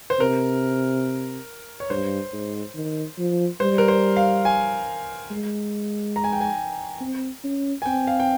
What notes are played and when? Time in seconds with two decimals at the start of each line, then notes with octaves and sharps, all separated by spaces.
0.10 C5
0.19 C3 A#4
1.80 C#5
1.90 G2 C5
2.33 G#2
2.75 D#3
3.18 F3
3.60 G3 C5
3.78 A#4
3.88 C5
4.17 F5
4.45 G#5
5.31 G#3
6.16 A#5
6.24 G#5
6.33 G5
6.41 G#5
7.00 C4
7.44 C#4
7.82 G#5
7.85 C4 G5
8.07 F5
8.20 G5